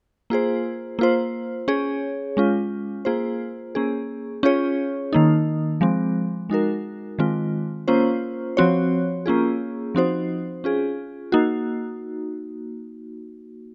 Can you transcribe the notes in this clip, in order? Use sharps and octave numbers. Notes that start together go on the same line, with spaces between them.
A#3 F4 G#4 C5
A#3 F4 C5
C#4 G#4 C#5
G#3 C#4 F4
A#3 F4 G#4 C5
A#3 C#4 G#4
C#4 F4 G#4 C#5
D#3 A#3 D#4
F3 G#3 C4
G#3 D#4 F#4 A#4
D#3 G#3 C4 F4
A#3 C#4 F4 C5
F3 C4 F#4 C#5
A#3 C#4 F4 G#4
F3 C4 D#4 F#4 C5
C#4 F4 G#4
A#3 D#4 F#4